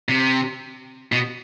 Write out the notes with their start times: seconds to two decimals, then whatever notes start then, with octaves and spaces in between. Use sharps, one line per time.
0.09 C3
1.12 B2